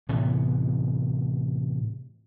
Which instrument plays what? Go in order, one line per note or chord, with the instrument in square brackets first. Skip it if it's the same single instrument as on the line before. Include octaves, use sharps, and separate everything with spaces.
[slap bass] A2 C3 E3 B3